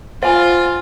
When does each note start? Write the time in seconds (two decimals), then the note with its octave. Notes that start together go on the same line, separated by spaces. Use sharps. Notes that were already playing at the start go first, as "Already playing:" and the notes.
0.23 F4 C5 F5 G#5